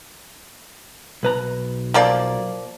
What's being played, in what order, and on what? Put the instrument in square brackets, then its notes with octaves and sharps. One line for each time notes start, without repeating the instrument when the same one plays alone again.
[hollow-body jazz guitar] B1 B4 A#5
[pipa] F3 A#3 D5